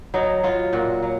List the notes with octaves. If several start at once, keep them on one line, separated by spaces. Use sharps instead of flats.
F#3 D#4
F#3 F4
A#2 F#4
F#3